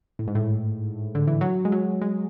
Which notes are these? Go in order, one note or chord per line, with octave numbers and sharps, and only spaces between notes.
A2
G#2
A2
D3
E3
F#3
G#3
F#3
G#3